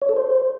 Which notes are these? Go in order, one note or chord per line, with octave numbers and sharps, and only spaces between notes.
C#5
A4
C5